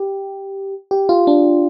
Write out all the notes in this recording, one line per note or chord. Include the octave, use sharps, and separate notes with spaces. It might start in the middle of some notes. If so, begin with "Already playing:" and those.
Already playing: G4
G4
F4
D4